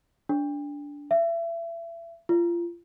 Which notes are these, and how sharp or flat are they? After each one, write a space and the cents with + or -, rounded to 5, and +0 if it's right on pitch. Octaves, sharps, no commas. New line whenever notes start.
D4 -15
E5 +30
F4 -25